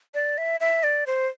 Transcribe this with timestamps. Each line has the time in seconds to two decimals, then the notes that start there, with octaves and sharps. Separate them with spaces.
0.14 D5
0.38 E5
0.60 E5
0.83 D5
1.07 C5